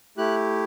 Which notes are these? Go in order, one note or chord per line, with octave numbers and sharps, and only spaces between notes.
A3 E4 G4 F#6